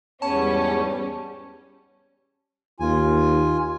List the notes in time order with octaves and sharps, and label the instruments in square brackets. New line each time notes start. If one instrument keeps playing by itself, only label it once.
[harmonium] E2 G#2 B3 [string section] G3 C#4 [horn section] C#5 [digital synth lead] A5
[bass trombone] D#2 [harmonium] F4 G#5